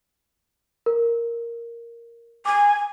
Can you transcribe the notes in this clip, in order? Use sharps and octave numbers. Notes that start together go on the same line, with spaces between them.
A#4
G#5 D6